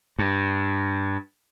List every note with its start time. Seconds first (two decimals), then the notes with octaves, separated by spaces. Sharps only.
0.19 G2